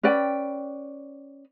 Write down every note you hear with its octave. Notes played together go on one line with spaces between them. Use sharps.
C#4 B4 D5 G5